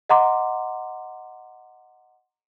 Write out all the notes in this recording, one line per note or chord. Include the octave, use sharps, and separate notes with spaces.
D#5 F#5 A#5 C6 D6